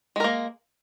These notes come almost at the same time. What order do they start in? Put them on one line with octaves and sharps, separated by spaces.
G#3 A#4 A#3